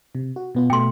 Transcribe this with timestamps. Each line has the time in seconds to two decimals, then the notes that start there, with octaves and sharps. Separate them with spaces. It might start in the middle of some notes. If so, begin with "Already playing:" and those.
0.15 C3
0.36 F#4
0.55 B2 B3 F4
0.70 B2 A3 G5 C6